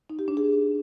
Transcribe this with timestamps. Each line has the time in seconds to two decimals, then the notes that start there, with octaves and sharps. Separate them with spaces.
0.10 D#4
0.19 G4
0.28 D4
0.37 G#4